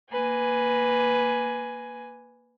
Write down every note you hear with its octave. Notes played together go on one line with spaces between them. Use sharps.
A#3 B4 G#5